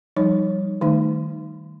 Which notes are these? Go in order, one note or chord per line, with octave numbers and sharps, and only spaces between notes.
F3 G3 D#4 C#5
D#3 A3 D#4